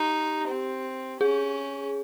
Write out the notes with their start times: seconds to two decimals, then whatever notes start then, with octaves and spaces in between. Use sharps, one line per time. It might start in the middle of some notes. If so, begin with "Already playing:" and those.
Already playing: D#4 G4
0.49 C4
1.21 C#4 G#4